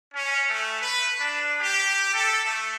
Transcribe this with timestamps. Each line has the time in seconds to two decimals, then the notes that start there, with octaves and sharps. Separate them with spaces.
0.14 C#4
0.48 A3
0.80 B4
1.19 D4
1.59 G4
2.14 A4
2.44 A3